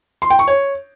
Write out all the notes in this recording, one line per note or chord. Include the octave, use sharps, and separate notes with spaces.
C6
G5
C#6
C#5